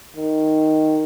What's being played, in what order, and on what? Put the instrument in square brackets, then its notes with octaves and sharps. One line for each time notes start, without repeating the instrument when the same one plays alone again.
[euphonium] D#3